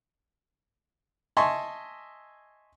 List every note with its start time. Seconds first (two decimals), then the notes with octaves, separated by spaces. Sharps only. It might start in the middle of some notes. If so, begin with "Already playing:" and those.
1.37 D#5 E5 G#5 A5 C6 C#6